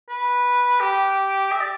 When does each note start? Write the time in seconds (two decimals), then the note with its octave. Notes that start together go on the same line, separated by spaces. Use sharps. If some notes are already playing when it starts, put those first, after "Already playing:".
0.09 B4
0.80 G4
1.52 E5
1.60 D5